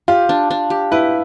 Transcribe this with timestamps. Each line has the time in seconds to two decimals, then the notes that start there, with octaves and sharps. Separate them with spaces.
0.08 F4 G4
0.29 D4
0.51 D4
0.70 G4
0.91 E4 B4